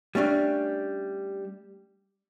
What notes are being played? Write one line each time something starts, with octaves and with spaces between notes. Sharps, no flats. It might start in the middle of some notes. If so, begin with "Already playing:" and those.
G3 A3 C#4 D4